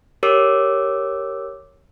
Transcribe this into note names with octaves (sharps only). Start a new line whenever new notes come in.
G4 A#4 C#5 D6 E6